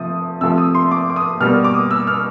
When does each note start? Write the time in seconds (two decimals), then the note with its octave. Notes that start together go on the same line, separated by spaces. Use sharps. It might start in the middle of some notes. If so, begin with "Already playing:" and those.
Already playing: C3 F3 A3 D#6
0.41 C3 F3 A3 E6
0.58 D#6
0.75 C6
0.91 D6
1.10 D6
1.16 D#6
1.41 B2 G3 A#3 F6
1.64 D6
1.74 D#6
1.91 E6
2.07 F6